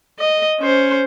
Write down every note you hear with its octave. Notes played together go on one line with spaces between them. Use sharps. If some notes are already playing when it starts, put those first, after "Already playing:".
D#5
C#4 C5